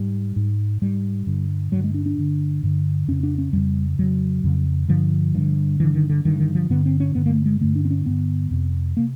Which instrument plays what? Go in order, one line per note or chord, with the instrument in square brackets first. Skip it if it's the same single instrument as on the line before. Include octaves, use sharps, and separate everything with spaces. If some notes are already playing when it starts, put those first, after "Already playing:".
Already playing: [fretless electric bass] G#2 G3
G#2
G#2 G3
G2 D3
G2 D3 F#3
G#3
D4
D4
G2 D3
G2 D3
F2 C#3 C#4
D4
C#4
F2 C#3 G3
F2 C#3 F#3
F2 C#3
G2 D3 F3
G2 D3
G2 D3 E3
D#3
D3
G2 D3 D#3
D#3
F3
G2 D3 B3
C4
C#4
G2 D3 B3
A#3
A3
G#3
G2 D3 A3
D4
C4
C#4
G2 D3 B3
F2 C3
C3 A#3